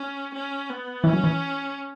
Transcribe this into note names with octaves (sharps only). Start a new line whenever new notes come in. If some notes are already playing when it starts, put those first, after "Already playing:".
Already playing: C#4
C#4
B3
E3 C#4
F#3
E3